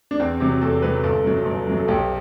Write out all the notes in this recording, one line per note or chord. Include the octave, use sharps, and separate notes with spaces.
D4
E2 C4
C3 F#3
E2 A4
C3 F#3 B4
G1 A4
F#2 F#3
G1
F#2 F#3
A4
B1 G4